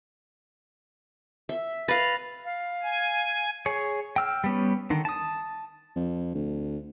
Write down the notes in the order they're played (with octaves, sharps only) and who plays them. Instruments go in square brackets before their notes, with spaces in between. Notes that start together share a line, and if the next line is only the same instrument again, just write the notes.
[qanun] E5
[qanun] B4 F5 [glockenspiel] B5 A6 A#6
[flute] F5
[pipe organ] G#5
[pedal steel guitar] G#4 C#5
G5 E6 F6
G3 B3 C#4
D3 D#3
A5 D#6
[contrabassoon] F2
D2